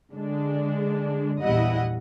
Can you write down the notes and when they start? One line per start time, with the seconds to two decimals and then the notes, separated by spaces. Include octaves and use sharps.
0.12 D3 G#3 D4
1.42 A#1 E2 G3 E4 D#5 F#5